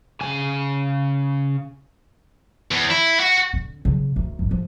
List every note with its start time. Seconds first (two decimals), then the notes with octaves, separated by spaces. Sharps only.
0.21 C#3 G#5
2.71 E2
2.90 E4
3.20 F#4
3.53 D3
3.85 C#3 F#3
4.16 D2 D#3
4.39 E2 G#2
4.51 F3